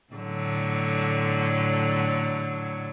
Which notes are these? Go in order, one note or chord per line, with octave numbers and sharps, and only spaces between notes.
A2 D3 F#3